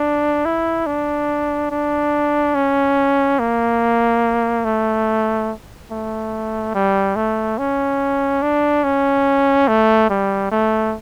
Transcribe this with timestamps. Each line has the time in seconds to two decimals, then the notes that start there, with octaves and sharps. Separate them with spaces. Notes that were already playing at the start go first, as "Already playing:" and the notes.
Already playing: D4
0.46 E4
0.87 D4
1.71 D4
2.55 C#4
3.39 A#3
4.65 A3
5.91 A3
6.75 G3
7.16 A3
7.58 C#4
8.42 D4
8.84 C#4
9.68 A3
10.10 G3
10.52 A3